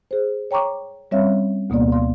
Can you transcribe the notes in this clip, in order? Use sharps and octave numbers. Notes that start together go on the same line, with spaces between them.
G#4 C5
C#5 G5 A#5 C#6 D6
G3 C4 C#4 C#5 E5 F5
D2 B2 A#3 B3 D5
D5 F5 C6